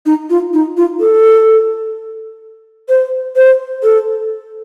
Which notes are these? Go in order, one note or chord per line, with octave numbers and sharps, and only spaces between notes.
D#4
F4
D#4
F4
A4
C5
C5
A4